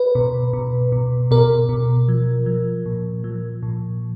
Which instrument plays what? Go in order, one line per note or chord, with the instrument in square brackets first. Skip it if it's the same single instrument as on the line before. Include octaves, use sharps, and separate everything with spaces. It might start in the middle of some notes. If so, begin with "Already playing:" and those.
Already playing: [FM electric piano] B4
B2
B2
B2
B2 A#4
B2
F3
F3
A#2
F3
A#2